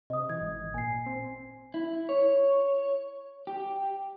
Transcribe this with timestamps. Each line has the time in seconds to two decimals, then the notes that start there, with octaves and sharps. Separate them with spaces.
0.10 C3 D#5 D#6
0.29 E3 G#6
0.41 G#1
0.74 A#2 G#5 C7
1.06 C4
1.74 E4
2.09 C#5
3.47 G4